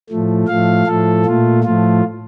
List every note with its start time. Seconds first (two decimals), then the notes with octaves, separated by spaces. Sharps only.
0.09 A2 F3 A3
0.47 A2 F3 A3 F5
0.86 A2 F3 A3 A4
1.25 A#2 A3 F4
1.63 A2 F3 A3 F4